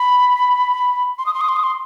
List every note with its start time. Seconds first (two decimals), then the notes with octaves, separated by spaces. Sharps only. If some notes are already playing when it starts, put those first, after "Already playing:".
Already playing: B5
1.18 C6
1.26 D#6
1.34 C6
1.41 D#6
1.49 C6
1.56 D#6
1.64 C6